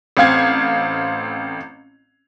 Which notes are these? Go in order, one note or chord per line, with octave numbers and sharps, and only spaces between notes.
A1 C4 F5 G#6